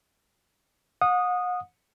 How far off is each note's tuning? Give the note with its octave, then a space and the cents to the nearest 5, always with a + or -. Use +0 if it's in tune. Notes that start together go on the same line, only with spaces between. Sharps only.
F#5 -40 D#6 -10